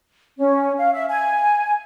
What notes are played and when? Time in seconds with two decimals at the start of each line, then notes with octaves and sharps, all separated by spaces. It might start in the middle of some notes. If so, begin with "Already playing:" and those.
0.38 C#4
0.78 F5
0.93 E5
1.09 G#5